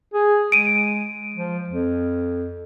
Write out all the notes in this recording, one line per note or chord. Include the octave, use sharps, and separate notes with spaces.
G#4
G#3 D7 D#7
F3
F2